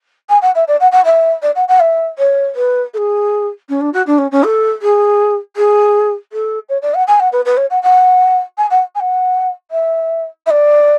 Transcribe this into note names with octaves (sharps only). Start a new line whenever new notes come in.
G#5
F#5
E5
D5
F#5
F#5
E5
D5
F#5
F#5
E5
C#5
B4
A4
G#4
C#4
D4
F#4
D4
C#4
C#4
A4
G#4
G#4
A4
C#5
D5
F#5
G#5
F#5
B4
B4
C#5
F#5
F#5
G#5
F#5
G#5
F#5
E5
E5
D5